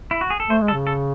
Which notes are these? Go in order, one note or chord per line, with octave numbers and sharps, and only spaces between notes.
E4
F#4
G#4
A4
A3 C5
G#3
A4
C#3
A4